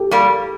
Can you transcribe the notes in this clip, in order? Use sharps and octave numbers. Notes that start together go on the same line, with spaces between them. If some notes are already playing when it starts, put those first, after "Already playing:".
Already playing: G4 A4
G3 A#3